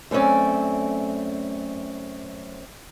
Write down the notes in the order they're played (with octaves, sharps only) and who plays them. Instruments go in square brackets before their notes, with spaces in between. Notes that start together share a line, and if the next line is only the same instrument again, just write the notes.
[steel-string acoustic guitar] F#2 A3 C4 C#4 D5